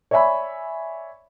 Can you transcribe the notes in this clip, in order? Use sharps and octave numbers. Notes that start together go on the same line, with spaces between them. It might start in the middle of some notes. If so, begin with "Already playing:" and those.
C#5 D5 E5 G#5 B5